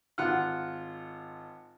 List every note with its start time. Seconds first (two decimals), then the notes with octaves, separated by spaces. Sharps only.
0.18 G#1 F4 F#5 F6